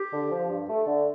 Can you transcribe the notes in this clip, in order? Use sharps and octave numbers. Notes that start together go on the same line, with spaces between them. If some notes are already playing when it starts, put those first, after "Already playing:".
Already playing: G4
D3
F3
G2
A3
D3